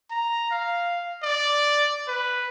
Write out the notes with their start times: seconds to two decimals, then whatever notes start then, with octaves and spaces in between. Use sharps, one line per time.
0.11 A#5
0.51 F5
1.23 D5
2.08 B4